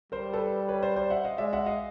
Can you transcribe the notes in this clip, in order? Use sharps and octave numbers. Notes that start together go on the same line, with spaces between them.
G3 A#4 C5
A4 B4
B4 C#5
C5 D5
C5 D5
E5 F#5
D#5 F5
G#3 D5 E5
E5 F#5
D#5 F5